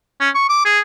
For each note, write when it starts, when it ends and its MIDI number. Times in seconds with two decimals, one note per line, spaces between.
0.20 0.29 61
0.35 0.47 85
0.49 0.62 86
0.65 0.80 68